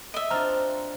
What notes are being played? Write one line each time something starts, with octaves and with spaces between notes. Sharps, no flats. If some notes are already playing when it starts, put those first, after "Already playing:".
D#5 E5
C4 D4 F4 A#5 F6